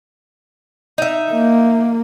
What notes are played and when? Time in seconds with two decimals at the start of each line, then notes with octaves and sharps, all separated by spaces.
0.98 D#4 E5
1.32 A#3